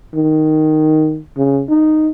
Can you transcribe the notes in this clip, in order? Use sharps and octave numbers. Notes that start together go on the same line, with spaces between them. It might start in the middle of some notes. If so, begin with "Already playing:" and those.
D#3
C#3
D#4